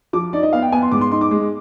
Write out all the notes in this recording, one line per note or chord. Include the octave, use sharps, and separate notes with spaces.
F3 D6
D#4 D5
D#5
B3 F5
G5
B3 G#5
C6
G#2 D6
C6
D#4 C6
D6
G#3